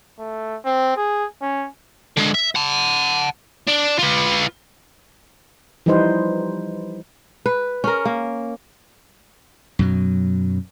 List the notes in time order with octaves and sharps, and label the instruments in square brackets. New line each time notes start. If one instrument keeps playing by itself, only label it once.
[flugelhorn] A3
C4
G#4
C#4
[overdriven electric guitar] D3 G#3
E5
F#5 A5
D4
F4 B4
[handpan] E3 F3 G3 D#4 B4 C5
[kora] B4
C#4 A#4
A#3
[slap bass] F#2 B2 F#3